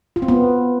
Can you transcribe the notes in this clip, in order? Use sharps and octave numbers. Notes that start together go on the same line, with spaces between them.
F4
C4
B3